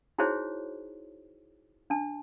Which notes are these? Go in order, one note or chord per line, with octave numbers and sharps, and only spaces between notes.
D#4 E4 F#4 G#4 C5 C#5
D4 A5